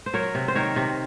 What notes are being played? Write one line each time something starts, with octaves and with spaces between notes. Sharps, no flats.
C5
F#3 A#4 C#5
C3
C5
D#3 A#4 C#5
C3